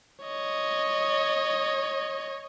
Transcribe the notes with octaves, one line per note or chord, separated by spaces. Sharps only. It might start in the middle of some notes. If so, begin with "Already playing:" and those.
C#5 D#5